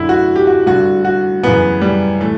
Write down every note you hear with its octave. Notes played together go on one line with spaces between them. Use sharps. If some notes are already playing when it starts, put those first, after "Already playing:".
Already playing: F#2 D3 E4
F#4
G4
F#4
G2 D3 F#4
F#4
F#2 C#3 E3 B3
G3
A2 E3 A3